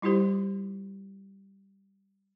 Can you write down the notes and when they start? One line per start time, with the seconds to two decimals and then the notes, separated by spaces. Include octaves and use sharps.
0.02 G3 E4 F4 G4 C5